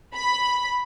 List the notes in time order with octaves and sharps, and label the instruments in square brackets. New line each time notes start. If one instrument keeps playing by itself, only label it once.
[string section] B5